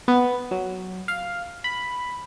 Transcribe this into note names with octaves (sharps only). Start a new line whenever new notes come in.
B3
F#3
F5
B5